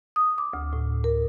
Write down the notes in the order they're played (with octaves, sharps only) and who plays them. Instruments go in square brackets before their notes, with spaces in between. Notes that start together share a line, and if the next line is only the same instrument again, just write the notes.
[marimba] D#6
D6
D2
A2
A#4